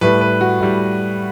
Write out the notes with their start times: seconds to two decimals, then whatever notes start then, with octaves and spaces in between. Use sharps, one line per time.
0.01 A2 G3 B4
0.21 B4
0.41 F#4
0.60 A2 G3